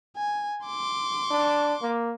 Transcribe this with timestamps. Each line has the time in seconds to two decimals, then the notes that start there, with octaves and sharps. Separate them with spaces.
0.16 G#5
0.66 C6 D6
1.31 D4
1.82 A#3